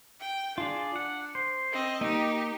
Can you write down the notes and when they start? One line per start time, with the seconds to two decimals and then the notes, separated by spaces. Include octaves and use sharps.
0.20 G5
0.58 D4 F4 G#4 D5
0.96 F#5
1.35 C5
1.72 C4 D#5
2.01 A#3 D#4 G4 D#5